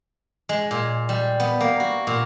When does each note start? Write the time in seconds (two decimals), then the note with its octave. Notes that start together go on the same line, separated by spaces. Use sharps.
0.49 G#3
0.71 A#2
1.09 G3
1.40 B3
1.60 A#3
1.80 F#4
2.07 A#2